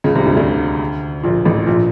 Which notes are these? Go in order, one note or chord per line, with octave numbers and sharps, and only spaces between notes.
C#2 C#3
C2 C3
D2 D3
D2 D3
A#1 A#2
A1 A2
A#1 A#2